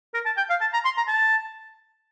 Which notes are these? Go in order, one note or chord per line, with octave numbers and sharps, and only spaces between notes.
A#4
A5
G5
F5
A5
A#5
C6
A#5
A5